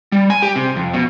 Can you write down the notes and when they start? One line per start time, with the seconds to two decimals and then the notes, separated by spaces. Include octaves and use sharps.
0.12 G3
0.30 G#5
0.42 G4
0.56 C3
0.76 F2
0.93 B2